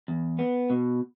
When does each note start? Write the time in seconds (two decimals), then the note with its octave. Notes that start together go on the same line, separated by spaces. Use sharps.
0.08 E2
0.39 B3
0.70 B2